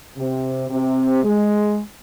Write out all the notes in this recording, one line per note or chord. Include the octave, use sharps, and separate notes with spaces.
C3
C3
G#3